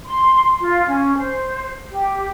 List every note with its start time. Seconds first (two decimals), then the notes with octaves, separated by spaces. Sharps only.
0.06 C6
0.60 F4
0.87 C#4
1.16 C5
1.90 G4